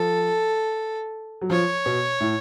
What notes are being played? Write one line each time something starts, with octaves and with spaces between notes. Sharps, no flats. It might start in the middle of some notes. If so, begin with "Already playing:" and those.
Already playing: F3 A4
F#3
F3 C#5
B2
A2